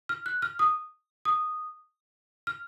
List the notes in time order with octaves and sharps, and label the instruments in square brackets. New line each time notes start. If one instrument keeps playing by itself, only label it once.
[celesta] F6
F#6
F6
D#6
D#6
F6